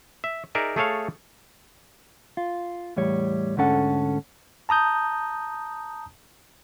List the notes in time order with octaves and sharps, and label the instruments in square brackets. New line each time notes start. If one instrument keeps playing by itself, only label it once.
[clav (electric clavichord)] E5
D#4 G#4 A#4 D5 E5
A3 G#4 A4 C#5 F5
[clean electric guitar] F4
E2 A2 G3 C#5
D2 G#2 D3 C#4 A4 F#5
[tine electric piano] A5 A#5 D#6 G6